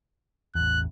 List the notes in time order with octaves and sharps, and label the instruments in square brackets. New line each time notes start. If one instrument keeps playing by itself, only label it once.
[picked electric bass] A1 E2 [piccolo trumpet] F#6